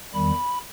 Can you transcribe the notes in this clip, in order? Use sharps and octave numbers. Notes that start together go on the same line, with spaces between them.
E2 D#3 G3 B5